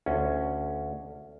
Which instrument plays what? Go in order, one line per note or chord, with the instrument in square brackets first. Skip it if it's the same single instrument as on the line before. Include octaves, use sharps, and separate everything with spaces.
[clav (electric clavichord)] D2 C#4